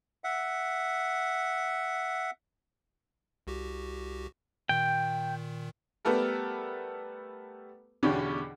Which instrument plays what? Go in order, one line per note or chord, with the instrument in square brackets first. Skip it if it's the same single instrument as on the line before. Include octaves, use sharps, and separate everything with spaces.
[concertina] E5 F#5
[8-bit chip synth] C2 F#4 G4
[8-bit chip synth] A#2 D#3 [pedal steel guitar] G5
[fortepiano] G3 A3 B3 A4 A#4
E2 B2 D3 C#4 D4 G4